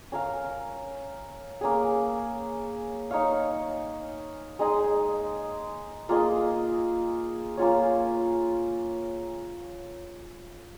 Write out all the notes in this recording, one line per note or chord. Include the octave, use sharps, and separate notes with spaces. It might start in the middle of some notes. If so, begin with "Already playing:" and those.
C#4 A#4 F5
A#3 C#4 G#4
D#4 C#5 F5
G#3 D#4 G#4 D#5
A#3 F4 G#4 D#5
A#3 C#4 F4 C#5